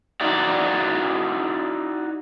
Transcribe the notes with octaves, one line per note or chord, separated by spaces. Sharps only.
D#4 E4 F#4 D5